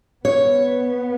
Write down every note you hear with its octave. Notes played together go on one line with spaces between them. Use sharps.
B3 C#5